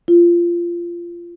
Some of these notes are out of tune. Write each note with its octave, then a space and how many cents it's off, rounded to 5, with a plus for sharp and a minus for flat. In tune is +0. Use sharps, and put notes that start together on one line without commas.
F4 -20